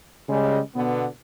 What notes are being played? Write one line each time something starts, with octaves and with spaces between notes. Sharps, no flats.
C#3 G3 G#3
B2 D3 B3